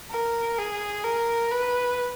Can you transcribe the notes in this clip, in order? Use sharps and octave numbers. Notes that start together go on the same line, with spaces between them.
A#4
G#4
A#4
B4